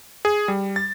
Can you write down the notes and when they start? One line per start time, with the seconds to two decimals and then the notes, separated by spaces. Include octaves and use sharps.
0.25 G#4
0.48 G3
0.76 A6